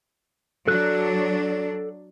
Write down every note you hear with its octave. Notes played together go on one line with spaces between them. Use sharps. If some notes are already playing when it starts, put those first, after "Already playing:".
F#3 D4 A4 F#6